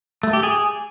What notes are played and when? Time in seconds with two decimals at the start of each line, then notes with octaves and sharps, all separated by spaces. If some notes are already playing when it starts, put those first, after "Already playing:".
0.23 A3
0.33 G4
0.43 G#4